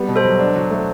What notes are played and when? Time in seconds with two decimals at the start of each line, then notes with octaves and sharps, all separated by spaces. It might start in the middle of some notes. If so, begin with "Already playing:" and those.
Already playing: G3 B3
0.08 B2
0.16 A4 C5
0.25 F#3
0.39 D4
0.56 F#3
0.71 A3